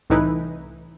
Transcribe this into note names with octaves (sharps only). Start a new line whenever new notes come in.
C2 A2 E3 D#4 E4 B4